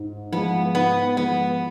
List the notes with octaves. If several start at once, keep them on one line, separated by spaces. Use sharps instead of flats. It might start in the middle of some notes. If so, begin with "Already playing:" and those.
Already playing: G#2
F3 G#3 B3
G#2 B3
F3 G#3 B3